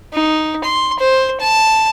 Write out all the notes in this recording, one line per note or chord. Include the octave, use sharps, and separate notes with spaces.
D#4
C6
C5
A5